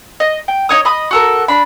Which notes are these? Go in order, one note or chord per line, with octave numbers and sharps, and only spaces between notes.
D#5
G5
D#4 C#5 D#6
D#5 B5 D#6
F#4 A4 A#4
D4 B5